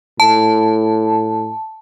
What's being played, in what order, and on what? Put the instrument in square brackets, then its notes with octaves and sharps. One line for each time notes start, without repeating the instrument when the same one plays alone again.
[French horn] A2 [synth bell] A5